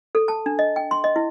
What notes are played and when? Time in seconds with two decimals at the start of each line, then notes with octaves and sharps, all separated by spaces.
0.15 A4
0.28 A5
0.46 D4
0.59 D#5
0.76 G5
0.91 C6
1.04 D#5
1.16 E4